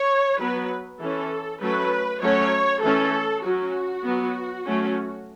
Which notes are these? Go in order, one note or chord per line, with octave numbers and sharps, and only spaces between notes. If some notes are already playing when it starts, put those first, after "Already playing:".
Already playing: C#5
F#3 B3 B4
E3 C#4 A4
F#3 A3 C#4 B4
F#3 A3 C#4 C#5
E3 A3 C#4 A4
F#3 C#4 F#4
F#3 B3
F#3 A3 C#4